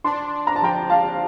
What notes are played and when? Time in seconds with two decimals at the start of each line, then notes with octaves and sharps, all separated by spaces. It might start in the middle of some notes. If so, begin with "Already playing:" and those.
0.04 D4 A5 C6
0.33 D4
0.47 A#5
0.56 A5
0.62 F3 G5 A#5
0.89 D4 F5 A5